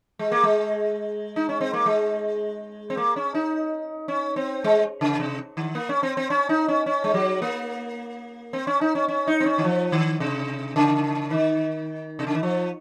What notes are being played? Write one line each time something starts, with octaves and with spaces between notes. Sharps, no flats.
G#3
A#3
G#3
D#4
C#4
C4
A#3
G#3
C4
A#3
C#4
D#4
C#4
C4
G#3
C#3
C3
D#3
A#3
C#4
C4
C4
C#4
D#4
C#4
C#4
G#3
F#3
A#3
C4
C#4
D#4
C#4
C#4
D#4
C4
C#4
D#3
F3
D#3
C3
C#3
D#3
C3
C#3
D#3
F3